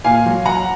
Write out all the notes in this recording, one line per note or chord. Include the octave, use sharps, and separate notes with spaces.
A#2 F5 G#5
F#3
F#3 F#5 A#5